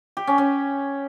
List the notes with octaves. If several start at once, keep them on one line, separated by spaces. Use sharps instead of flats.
G4
C#4
C#4